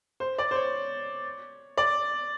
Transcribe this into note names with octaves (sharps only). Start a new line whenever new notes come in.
C5
D5
C5
C#5
D5